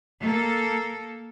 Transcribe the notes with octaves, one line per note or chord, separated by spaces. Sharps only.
A#3 A4